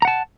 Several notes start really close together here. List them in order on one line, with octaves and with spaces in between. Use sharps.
A#5 F#5 A5